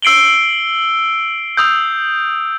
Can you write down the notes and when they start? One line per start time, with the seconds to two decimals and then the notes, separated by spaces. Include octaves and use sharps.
0.02 E6 C7 D7 F#7 G7
1.57 D#6 E6 G6